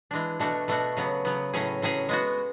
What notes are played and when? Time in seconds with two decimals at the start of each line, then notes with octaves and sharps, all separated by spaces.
0.11 E3 G#3 D4
0.40 B2 A3 D4 F#4
0.68 B2 A3 D4 F#4
0.97 C#3 F#3 B3
1.25 C#3 F#3 B3
1.53 A2 F#3 C#4 G#4
1.82 A2 F#3 C#4 G#4
2.09 G#3 B3 F#4